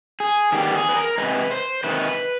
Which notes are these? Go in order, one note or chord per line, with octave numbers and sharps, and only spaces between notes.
G#4
D#3 G3 B3 G4
G#4
B4
A#4
C3 D#3 G#3 B4
C5
C3 D#3 G#3 B4